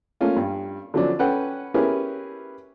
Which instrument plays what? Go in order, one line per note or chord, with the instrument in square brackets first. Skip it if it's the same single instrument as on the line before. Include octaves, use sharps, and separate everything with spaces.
[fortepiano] A3 A#3 C#4 F4
G2
D3 F3 F#3 C#4 D4
C#4 A4 B4 F#5 G5
C#4 E4 G4 G#4 A#4 B4